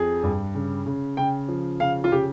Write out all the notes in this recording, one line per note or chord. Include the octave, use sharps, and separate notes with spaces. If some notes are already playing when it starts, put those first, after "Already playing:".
Already playing: F2 G#4
G2
C#3
C#3
C#3 G5
F3
C#3 F5
F4
C#3 G4